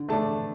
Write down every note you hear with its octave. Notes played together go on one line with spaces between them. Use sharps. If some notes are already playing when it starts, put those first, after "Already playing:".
Already playing: D3
A3 D4 A5